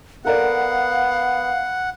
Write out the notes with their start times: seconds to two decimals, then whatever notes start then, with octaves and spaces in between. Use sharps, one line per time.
0.25 B3 A4 A#4 D5 F5 F#5